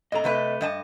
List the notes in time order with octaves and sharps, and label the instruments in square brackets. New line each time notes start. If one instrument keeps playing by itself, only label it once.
[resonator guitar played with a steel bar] A2 A#5 [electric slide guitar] A4 D#5
[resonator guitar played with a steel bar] C3 A3 B4
G2 D#5 A5